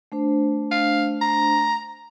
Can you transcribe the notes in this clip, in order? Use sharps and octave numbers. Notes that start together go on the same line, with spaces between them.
A3 D4 C5
F5
A#5